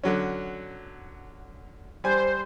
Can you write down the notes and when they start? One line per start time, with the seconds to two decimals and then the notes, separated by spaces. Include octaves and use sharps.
0.03 D3 F#3 C#4
2.04 G3 C5 G#5